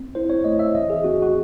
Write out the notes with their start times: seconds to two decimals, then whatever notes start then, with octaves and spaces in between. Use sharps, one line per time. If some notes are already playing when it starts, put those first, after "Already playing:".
Already playing: C4
0.15 E4 C5
0.30 C#5
0.44 A3 D#5
0.59 E5
0.74 E3 D#5
0.90 G#4
1.04 C4 F#4
1.22 F#4